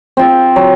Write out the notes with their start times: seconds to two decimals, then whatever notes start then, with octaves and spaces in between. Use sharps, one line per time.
0.17 C4 F4
0.56 F#3